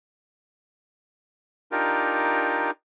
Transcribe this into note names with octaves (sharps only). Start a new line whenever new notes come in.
D4 D#4 F4 G4 A#4